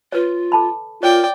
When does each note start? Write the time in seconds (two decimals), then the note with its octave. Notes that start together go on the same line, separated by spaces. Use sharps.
0.12 F4 B4 C#5
0.52 A4 A5 B5
1.03 F4 A#4 C#5 D5 G5